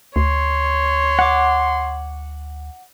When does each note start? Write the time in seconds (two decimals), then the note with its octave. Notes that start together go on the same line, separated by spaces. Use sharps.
0.16 D2 C#5 C6
1.19 F#5 D6